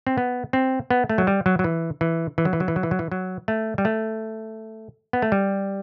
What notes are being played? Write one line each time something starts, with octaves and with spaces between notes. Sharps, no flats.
C4
B3
C4
B3
A3
F#3
G3
F#3
F#3
E3
E3
E3
F#3
E3
F#3
E3
F#3
E3
F#3
E3
F#3
A3
G3
A3
B3
A3
G3